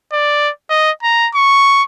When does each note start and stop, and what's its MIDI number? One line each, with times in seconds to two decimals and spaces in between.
0.13 0.50 74
0.70 0.91 75
1.03 1.29 82
1.35 1.83 85